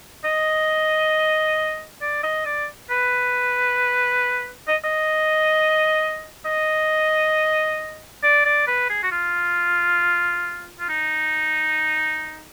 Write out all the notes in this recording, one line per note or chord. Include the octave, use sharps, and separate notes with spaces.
D#5
D5
D#5
D5
B4
D#5
D#5
D#5
D5
D5
B4
G#4
F#4
F4
F4
D#4